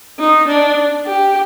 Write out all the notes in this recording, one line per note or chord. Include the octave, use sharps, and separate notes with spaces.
D#4
D4
G4